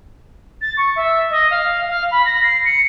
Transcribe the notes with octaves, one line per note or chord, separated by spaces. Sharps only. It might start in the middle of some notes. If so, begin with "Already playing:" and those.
A6
C#6
E5
D#5
F5
F5
B5
A#6
C7
C#7